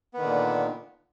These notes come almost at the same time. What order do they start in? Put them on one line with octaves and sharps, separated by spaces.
B3 D#3 D3 A#2